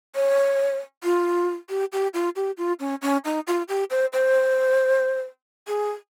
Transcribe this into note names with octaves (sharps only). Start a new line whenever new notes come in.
C#5
F4
G4
G4
F4
G4
F4
C#4
C#4
D#4
F4
G4
C5
C5
G#4